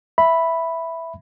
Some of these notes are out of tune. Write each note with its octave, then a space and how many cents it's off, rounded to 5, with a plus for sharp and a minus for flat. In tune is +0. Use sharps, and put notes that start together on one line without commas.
E5 +0 B5 +0